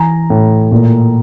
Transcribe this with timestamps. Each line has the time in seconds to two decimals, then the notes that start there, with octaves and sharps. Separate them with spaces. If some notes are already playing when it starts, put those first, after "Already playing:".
Already playing: E3 G#5 A#5
0.30 A2
0.72 A#2